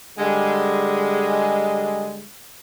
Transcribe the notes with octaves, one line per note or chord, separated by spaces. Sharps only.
D3 G3 G#3